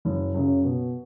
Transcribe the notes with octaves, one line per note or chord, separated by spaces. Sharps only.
F#1
F#2 C#3
B2